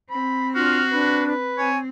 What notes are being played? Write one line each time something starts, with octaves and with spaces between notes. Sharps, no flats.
C4 B5
D4 F4 F#4 F6
D4 B4
B4
C4 C#5 G#5